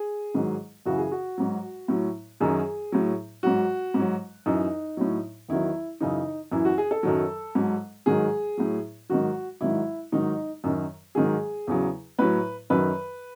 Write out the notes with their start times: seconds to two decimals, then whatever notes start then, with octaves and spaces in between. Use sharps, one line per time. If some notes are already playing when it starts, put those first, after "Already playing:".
Already playing: G#4
0.34 G#2 D#3 F#3
0.86 F#2 C#3 E3 F#4
0.98 G#4
1.12 F#4
1.38 G#2 F#3
1.88 A2 F#3
2.40 F#2 D#3 F#3 G#4
2.92 A2 F#3
3.43 G#2 F#3 F#4
3.94 G#2 F#3
4.46 F#2 E3 D#4
4.97 A2 F#3
5.49 E2 D#3 F#3 E4
6.00 F#2 C#3 E3 D#4
6.52 F#2 E3 E4
6.65 F#4
6.78 G#4
6.91 A4
7.03 F#2 D#3 F#3
7.55 G#2 F#3
8.06 G#2 D#3 F#3 G#4
8.57 A2 F#3
9.09 G#2 D#3 F#3 F#4
9.61 G#2 D#3 F#3 E4
10.12 G#2 D#3 F#3 D#4
10.64 F#2 D#3 F#3
11.15 G#2 D#3 F#3 G#4
11.67 E2 C#3 F#3
12.19 A2 F#3 B4
12.70 F#2 D#3 F#3 B4